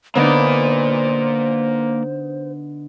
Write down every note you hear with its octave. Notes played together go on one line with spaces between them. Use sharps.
D3 A#3 B3 D#4 C5 D5